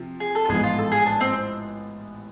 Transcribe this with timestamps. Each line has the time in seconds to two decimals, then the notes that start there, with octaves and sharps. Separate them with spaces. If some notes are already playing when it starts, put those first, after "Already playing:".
Already playing: C3 F3
0.20 G#4
0.35 A4
0.45 F4
0.49 A1 G#2 F3 B3 G#4
0.63 F4
0.78 A4
0.92 G#4
1.06 D4
1.21 C4